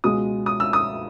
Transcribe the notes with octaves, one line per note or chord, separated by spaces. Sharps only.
C#2 B2 G#3 D#6
D#6
E6
D#6